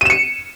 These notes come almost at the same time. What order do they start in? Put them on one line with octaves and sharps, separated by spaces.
D#7 E7 C#7